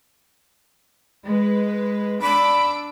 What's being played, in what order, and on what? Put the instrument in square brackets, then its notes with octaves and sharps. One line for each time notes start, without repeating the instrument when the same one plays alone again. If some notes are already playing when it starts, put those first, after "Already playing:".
[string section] G#3 B4
[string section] D4 D6 E6 [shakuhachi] B5